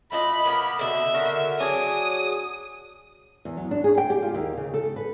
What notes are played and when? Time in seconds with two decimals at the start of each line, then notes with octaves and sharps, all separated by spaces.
0.12 A3 F4 D#5 B5
0.45 A#3 B3 A#4
0.79 B2 D3 E5
1.14 D3 F#4 A#4
1.60 F#3 D4 G#4 D#6
3.45 E2
3.57 F#3
3.71 D4
3.84 G#4
3.98 G5
4.10 G4
4.23 F4
4.34 D#2
4.57 C#3
4.74 A4
4.96 B4